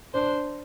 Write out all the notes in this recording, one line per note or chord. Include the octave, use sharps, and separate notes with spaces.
D4 C5